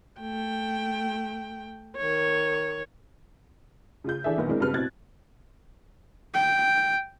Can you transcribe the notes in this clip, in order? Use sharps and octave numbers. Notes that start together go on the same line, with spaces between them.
A3 G5
D#3 C#5
C#3 F4 G6
E3 D4 G#4 A4 E5
B1 A#2 D#3 B3
G#3 C4 D4 E4 A#4
G2 C#3 F#3 C4 B4 F6
B2 C4 E4 F#6 G#6 A6
G5